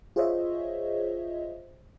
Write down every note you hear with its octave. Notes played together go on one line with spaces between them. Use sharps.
F4 G#4 C5 C#5 D#5 E5